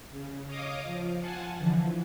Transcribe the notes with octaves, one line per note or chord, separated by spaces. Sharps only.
C#3
C#5 D#5 F5 D6 D#6
F3
F4 F#5 G#5 A5
D3 E3 F3